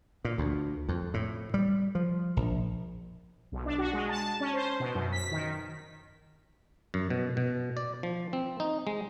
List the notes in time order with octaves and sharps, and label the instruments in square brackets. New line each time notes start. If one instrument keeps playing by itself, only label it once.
[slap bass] A#2
D2
F2
A2
G3
F3
A#1
[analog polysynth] B1
D4
F#4
G#3
A5
C#4
C5
B2
F#2
B6
D#3
[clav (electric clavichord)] F#2
B2
B2
D5
F3
C4
D#4
G#3